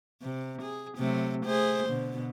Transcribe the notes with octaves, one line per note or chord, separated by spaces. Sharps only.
C3
G#4
C3 F#3 A3
A3 G#4 C5
B2 D3